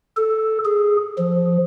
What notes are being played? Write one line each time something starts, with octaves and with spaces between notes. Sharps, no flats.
A4
G#4
F3